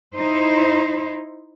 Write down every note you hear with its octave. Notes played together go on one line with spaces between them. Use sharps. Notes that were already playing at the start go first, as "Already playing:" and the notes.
D#4 E4 C5